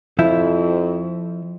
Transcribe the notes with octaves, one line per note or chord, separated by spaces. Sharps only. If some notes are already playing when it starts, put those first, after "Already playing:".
F2 F3 E4